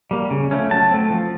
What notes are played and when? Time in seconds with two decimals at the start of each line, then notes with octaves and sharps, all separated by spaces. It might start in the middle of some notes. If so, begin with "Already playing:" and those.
0.11 G3 A#3
0.30 C#3
0.51 F3 A3 C#4
0.71 F#3 A5
0.91 A3 C4
1.10 F3